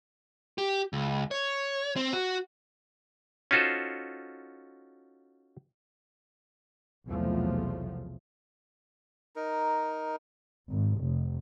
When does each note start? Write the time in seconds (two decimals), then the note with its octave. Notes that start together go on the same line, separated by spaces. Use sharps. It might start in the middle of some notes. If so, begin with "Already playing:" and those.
0.58 G4
0.93 C#2
1.31 C#5
1.96 C4
2.13 F#4
3.51 C#4 D#4 F4 F#4 A4 C5
7.08 B1 E2 C3 F3 F#3 A3
9.36 D#4 A#4
10.69 G#1
11.00 F1